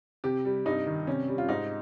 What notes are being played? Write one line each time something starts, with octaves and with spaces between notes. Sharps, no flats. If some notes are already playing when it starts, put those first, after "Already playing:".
C3 G4
G3
G2 D#4
D#3
C3 C#4
G3
F4
G#2 D#4